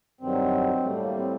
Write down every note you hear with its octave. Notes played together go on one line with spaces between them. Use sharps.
G2 D#3 F#3 C4
A2 G3 A3
A#3
C4